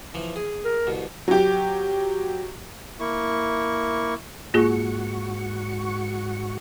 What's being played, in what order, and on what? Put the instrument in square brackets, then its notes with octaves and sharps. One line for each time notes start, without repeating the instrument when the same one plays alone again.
[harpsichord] E3 F3
G#4
[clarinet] A#4
[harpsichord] C2 B2
[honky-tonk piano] F#3 G4
[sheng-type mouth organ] A#3 E4 C#6
[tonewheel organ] G#2 F#4 C#6 [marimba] A#3 F4 G#4